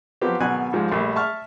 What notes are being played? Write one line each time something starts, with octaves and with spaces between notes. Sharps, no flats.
F3 F#3 B3 C4 G4
G#1 B2 F#3 F#4 G#5 F#6
G#2 F3 G3 G#3
A#1 G3 A3
E5 A5 C#6 F6